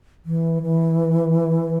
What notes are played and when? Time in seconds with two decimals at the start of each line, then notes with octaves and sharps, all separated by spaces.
0.26 E3
0.63 E3